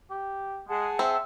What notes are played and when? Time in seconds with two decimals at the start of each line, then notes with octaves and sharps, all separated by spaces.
0.10 G4
0.69 G#3 G#4 F#5 A5
0.99 C4 E5